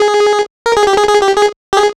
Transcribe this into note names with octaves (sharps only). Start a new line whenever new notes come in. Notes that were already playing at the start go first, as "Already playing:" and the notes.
Already playing: G#4
A#4
G#4
G4
G#4
G#4
G4
G#4
G4
G#4